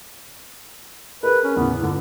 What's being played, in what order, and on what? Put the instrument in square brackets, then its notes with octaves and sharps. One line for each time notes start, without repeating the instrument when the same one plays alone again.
[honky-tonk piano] G#4 A#4 [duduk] B4
[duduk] C#4
[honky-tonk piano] E2 A2 C#3 [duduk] B3
[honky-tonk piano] G1 [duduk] D3